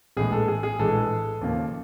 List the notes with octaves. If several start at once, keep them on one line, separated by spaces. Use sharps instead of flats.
A#1 A2 E3 G#3 G#4
A4
G#4
G#4
A#1 A2 E3 G#3 A4
D#2 C#3 F3 A#3